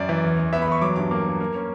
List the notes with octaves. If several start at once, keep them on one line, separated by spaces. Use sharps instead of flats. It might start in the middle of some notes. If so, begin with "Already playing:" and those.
Already playing: F#2 D5
E3
E2
E2
B3 E5
B5
E2 C#6
F#3 D6
G2 D6
A#3 D6
A#3
A#3
C#4